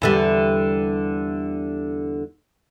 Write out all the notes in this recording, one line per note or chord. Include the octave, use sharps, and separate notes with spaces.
E2 D3 G3